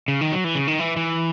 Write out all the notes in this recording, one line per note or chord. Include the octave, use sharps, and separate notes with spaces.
C#3
D#3
F#3
E3
C#3
D#3
E3
E3